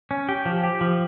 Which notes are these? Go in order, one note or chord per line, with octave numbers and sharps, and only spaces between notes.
C#4
G4
F3
G4
F3